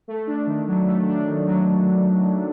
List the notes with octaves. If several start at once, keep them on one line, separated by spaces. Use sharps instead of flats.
A3
D4
D#3
F#3
A3
D4
D#3
F#3